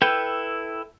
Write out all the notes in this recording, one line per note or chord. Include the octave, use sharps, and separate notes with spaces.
E4 A4 B4 G5 G6